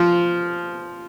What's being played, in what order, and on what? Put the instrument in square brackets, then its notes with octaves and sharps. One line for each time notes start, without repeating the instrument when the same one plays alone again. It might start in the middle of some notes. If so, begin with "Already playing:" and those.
Already playing: [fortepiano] F3